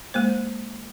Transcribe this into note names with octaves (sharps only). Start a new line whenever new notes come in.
G#3 A#3 C5